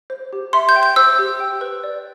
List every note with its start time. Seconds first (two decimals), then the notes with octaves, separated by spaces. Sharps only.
0.10 C5
0.33 G4
0.53 E5 C6
0.69 G6
0.76 G5
0.83 G6
0.96 C5 E6
1.19 G4
1.40 G5
1.61 B4
1.83 D5